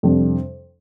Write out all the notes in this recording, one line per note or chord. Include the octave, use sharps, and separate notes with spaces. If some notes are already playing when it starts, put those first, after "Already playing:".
F2 C3 G3 D4